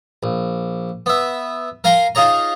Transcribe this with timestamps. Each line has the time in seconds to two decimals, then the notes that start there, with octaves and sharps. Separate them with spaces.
0.23 A#1
1.06 B3 E5
1.84 A#4 F5 G#5 A#5 C6
2.15 D#4 F4 G#4 C#5 A#5